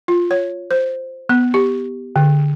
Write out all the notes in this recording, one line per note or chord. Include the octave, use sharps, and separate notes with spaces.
F4
C#5
C5
B3
G4
D3